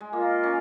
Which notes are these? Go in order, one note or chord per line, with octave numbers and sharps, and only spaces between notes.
G#3
A#3 F4 A#4 D#5
C#4